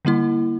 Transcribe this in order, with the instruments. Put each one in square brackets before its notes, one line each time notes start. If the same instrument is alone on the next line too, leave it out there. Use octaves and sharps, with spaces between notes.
[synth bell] D3 G3 A#3 E4